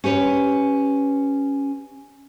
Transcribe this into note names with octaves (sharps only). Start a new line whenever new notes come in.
C#4 G4 B4 C#5